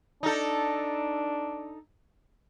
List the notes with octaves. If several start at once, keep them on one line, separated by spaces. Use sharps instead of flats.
D4 D#4 A4